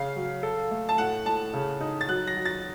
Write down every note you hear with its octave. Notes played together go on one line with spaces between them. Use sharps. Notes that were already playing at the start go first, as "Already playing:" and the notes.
Already playing: C#3 F5
F#3
A4
A3
A5
A2 F#5
A2 A5
C#3
D#4
A6
F#3 F#6
A#6
F#3
A6